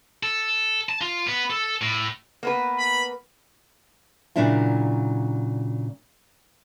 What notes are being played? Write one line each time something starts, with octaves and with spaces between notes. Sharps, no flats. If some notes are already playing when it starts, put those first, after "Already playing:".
A4
A5
F4
B3
A4
A2
A#3 B3 B4
B5
A#2 C#3 F#3 D4 E4 F4